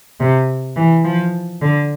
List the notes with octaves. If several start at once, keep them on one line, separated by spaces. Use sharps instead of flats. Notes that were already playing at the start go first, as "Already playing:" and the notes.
C3
E3
F3
D3